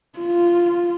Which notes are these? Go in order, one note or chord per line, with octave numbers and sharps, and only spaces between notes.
F4